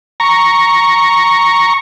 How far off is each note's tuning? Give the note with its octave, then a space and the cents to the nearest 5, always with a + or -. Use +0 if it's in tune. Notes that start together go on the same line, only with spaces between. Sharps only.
A#5 +0 C#6 +0